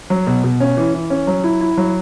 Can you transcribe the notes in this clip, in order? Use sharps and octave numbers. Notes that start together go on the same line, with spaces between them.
F#3
B2
B2
C#4
E3
E3
C#4
F#3
E4
E4
F#3